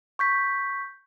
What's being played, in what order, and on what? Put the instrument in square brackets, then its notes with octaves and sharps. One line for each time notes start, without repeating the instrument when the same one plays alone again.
[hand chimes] C#6 G6 B6